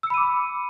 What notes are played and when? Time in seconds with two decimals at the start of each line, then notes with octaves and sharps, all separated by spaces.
0.03 E6
0.07 C#7
0.10 B5
0.14 D#7
0.17 D6